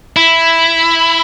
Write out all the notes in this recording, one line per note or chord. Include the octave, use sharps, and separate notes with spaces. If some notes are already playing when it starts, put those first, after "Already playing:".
E4